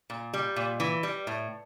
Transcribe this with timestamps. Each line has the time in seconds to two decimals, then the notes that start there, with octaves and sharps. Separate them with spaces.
0.10 A#2
0.33 G3
0.56 A#2
0.80 E3
1.03 G3
1.27 A2